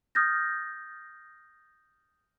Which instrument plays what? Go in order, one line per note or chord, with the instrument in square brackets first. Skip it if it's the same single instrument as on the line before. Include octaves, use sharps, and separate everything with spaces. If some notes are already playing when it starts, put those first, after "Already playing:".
[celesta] D#6 F6 G6 A6 A#6